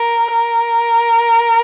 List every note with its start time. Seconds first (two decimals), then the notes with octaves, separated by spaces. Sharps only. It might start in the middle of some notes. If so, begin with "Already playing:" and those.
Already playing: A#4
0.32 A#4